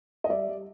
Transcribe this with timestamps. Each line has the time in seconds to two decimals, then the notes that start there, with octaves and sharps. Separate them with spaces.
0.24 D#5
0.29 G3 D5 E5
0.48 G3